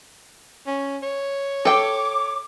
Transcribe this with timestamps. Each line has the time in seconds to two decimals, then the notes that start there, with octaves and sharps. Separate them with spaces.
0.67 C#4
1.02 C#5
1.65 A4 G5 D6